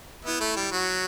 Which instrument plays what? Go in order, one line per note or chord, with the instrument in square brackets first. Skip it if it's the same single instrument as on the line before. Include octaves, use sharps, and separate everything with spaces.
[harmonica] B3 [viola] E4
[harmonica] A3
G3
[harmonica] F#3 [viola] F#4